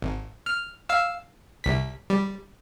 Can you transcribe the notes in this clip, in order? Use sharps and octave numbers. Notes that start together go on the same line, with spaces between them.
G#1
F6
F5 E6
C2 B6
G3